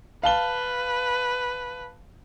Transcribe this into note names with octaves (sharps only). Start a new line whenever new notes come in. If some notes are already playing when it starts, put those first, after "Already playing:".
B4 F5 A5 G7